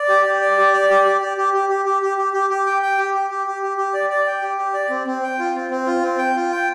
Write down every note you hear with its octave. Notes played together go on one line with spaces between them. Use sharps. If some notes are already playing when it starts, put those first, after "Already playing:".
Already playing: D5
G4
G4
D5
G4
D5
G4
G4
G4
G4
G4
G4
G4
G4
G4
G4
G4
G5
G5
G4
G4
G4
G4
G4
G4
D5
D5
G5
G4
G4
D5
C4
C4
G5
F4
C4
C4
F4
C4
G5
F4
G5